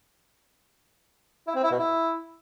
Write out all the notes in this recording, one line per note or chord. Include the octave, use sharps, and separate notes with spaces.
E4
C4
E4
B2
E4